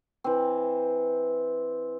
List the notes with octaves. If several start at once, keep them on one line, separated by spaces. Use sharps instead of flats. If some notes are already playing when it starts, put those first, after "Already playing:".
E3 C4